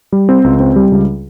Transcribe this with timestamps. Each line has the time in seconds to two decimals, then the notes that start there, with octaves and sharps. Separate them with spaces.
0.12 G3
0.29 C4
0.44 C#2
0.60 C4
0.76 G3
0.92 C#2